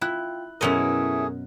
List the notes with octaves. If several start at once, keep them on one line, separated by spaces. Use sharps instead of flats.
E4 F4 G5 F#6
F#2 B2 A3 C#4 E4 G#4 A#4 D#5